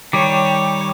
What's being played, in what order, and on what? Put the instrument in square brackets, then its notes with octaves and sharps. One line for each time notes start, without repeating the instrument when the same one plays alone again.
[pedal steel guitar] D#3 G3 [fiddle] C#5 [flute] G5 [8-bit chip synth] D6